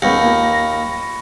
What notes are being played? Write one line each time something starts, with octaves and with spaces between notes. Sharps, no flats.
D#2 G#3 B3 C#4 B5 C#6 A#6 C#7
A#3 F4